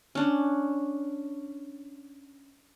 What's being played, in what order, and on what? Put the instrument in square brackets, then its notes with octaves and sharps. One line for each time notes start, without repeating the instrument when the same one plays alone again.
[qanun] C#4 D4